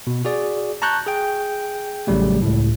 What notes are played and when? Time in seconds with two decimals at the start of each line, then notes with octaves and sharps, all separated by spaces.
0.07 B2
0.25 F#4 G#4 D5
0.82 A5 A#5 C#6 F#6 G6
1.06 G#4 G5
2.07 A1 C#3 F#3 G3 A3
2.42 C#2 A2